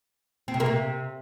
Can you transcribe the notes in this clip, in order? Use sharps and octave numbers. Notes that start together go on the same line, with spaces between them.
C4
C3
A#3
C3